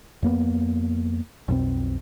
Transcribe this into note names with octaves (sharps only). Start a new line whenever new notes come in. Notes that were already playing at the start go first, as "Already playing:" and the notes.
F2 A#3 B3
B1 F2 B2 C4